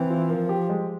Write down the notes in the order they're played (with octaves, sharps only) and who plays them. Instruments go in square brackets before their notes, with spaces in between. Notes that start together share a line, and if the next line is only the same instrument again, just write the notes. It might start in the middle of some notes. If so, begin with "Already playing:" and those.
Already playing: [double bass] E3 [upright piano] C4
[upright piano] F4
[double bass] F3 [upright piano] A#4
[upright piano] G4
G#3